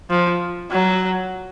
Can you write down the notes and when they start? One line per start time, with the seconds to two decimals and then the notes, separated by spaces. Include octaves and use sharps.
0.10 F3
0.71 F#3